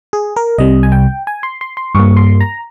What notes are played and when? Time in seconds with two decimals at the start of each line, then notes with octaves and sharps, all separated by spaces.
0.13 G#4
0.36 A#4
0.58 C2 C3 G3 D#5
0.83 G#5
0.92 G5
1.27 G#5
1.43 C6
1.61 C6
1.77 C6
1.95 G2 G3 A#3 C#6
2.17 C6
2.40 A#5